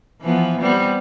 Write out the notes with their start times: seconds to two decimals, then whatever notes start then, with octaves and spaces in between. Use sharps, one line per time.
0.21 E3 F3 B3
0.60 G3 B3 C4